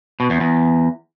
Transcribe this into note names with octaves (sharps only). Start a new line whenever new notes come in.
B2
E2
E2